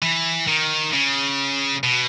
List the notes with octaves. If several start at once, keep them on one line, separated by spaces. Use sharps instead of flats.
E3
D#3
C#3
B2